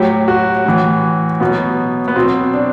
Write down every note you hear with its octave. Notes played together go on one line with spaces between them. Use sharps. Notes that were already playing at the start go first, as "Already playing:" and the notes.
Already playing: A2 F#3 G4
F#4
A2 E3
B2 F#3 B3
B3
B2 F#3 C4
D4